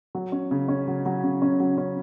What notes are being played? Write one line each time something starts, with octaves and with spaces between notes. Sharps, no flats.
F#3
C#4
C#3
C#4
F#3
F#3
C#3
C#4
F#3
C#4